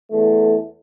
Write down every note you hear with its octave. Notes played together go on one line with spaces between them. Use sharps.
E2 A3